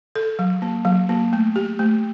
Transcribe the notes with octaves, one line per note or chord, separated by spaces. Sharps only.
A4
F#3
A#3
F#3
A#3
A3
G4
A3